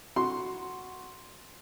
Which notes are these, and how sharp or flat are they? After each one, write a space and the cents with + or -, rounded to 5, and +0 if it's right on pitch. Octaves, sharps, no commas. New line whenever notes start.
F#4 +0 C6 +0